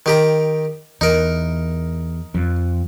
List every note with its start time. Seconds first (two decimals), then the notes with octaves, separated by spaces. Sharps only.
0.06 D#3 G4 A#5
1.01 E2 D#4 A#4
2.35 F2